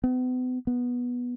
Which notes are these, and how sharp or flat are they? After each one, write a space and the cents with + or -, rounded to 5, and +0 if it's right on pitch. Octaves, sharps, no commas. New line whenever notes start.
B3 +40
B3 -10